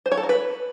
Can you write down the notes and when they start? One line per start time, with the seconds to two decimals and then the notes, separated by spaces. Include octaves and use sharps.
0.06 C5
0.12 C#5
0.17 A4
0.23 A#4
0.29 B4